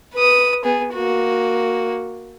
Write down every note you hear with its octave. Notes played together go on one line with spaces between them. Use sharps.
B4 D#6
B3 G#4
A#3 F#4